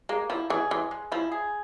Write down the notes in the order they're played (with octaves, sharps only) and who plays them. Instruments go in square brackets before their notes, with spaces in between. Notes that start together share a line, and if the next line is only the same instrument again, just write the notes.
[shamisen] G#3 [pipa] A#3
[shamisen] F3 [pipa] E4
[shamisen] E3 [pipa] G#4
[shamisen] E3 [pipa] G#3
[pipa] G#3
[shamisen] F3 [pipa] E4
[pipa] G#4